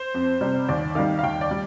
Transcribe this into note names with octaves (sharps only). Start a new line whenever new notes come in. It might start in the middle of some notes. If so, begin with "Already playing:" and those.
Already playing: C5
F2
C3 G3
D#2 D5
D#3 G3 F5
F5
D#2 G5
D5
G3